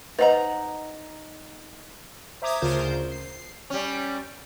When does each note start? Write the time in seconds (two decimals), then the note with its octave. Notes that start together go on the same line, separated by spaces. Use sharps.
0.19 D#4 B4 C5 D#5 F#5 A#5
2.42 C5 E5 A#5 D6 D#6 G#6
2.62 D2 C#3 F4 A#4 C5 G6
3.11 C7
3.70 G3 C#4